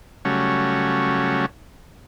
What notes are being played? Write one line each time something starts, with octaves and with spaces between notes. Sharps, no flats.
C#3 F#3 G3 A3 C#4